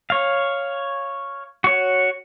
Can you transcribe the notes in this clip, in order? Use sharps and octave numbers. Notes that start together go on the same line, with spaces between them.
C#5 F5
F#4 C#5